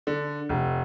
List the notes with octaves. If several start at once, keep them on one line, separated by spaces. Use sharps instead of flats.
D3
F1